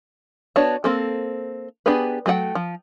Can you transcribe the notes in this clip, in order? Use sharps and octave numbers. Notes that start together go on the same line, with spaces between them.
B3 D4 F#4 C#5 A5
A#3 C4 A4
B3 D4 G4 G#4 B4
F#3 A3 G#4 F#5 G5
F3